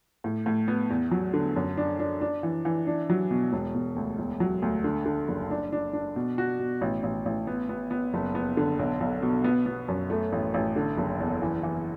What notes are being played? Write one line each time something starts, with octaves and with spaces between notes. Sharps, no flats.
A2
A2
B3
E2
F#3
D3
F#2
D4
D4
D4
E3
E3
D4
F#3
B2
E1
E1
D2
E1
F#3
D2
D3
D3
F#1
D4
D4
D4
B2
F#4
B2
A1
A1
A1
B3
B3
B3
F#1
B3
D3
B1
B1
B2
B3
B3
F#2
A3
A1
A1
D3
F#1
E2
E3
E3